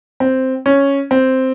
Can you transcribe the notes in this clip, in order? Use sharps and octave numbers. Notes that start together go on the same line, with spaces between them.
C4
C#4
C4